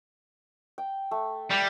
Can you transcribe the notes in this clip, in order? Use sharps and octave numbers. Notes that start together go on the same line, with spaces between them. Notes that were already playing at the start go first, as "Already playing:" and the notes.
G5
A3
G3